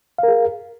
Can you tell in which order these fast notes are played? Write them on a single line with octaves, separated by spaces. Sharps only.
F5 A#4 G#4